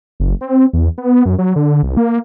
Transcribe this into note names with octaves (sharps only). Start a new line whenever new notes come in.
F#1
C4
E2
B3
F#2
F#3
D3
C2
A#3